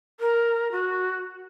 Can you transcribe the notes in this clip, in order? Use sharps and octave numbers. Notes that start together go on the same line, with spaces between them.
A#4
F#4